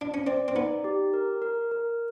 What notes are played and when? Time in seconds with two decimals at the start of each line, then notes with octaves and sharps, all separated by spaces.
0.01 D4
0.14 C#4
0.27 C4 D5
0.48 C4
0.55 B3 D#4
0.84 G4
1.14 A#4
1.42 A#4
1.71 A#4